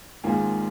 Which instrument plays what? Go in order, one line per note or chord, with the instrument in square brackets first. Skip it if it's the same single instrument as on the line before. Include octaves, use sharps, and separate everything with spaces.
[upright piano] G#1 G#2 D#3 A#3 F4 G#5